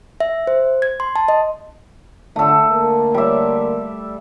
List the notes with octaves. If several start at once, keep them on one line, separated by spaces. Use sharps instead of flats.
E5
C5
G#6
C6
A5
D#5
D3 A3 A4
D3 A#3 A#4
G3 E5